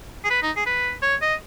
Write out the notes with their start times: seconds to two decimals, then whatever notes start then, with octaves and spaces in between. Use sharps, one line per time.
0.24 G#4
0.30 B4
0.42 D#4
0.57 G#4
0.66 B4
1.02 C#5
1.22 D#5